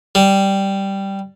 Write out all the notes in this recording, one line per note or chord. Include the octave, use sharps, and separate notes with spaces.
G3